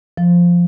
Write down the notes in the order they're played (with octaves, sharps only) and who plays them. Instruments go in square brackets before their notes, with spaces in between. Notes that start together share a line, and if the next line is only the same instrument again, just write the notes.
[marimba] F3